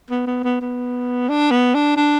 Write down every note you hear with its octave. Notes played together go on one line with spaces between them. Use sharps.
B3
B3
B3
B3
D4
B3
D4
D4